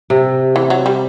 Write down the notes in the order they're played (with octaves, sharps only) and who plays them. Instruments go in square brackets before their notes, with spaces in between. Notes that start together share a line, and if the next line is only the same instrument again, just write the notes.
[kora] C3
[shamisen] E3
F#3
G3